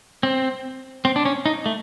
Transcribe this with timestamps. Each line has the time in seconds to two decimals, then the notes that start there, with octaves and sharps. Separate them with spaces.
0.23 C4
1.05 C4
1.16 D4
1.25 C#4
1.46 D#4
1.66 A3